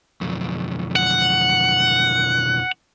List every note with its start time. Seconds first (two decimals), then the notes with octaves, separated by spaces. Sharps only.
0.21 B1 F2
0.96 F#5